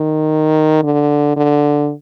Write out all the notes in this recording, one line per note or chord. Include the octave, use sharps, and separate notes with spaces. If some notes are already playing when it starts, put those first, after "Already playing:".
Already playing: D#3
D3
D3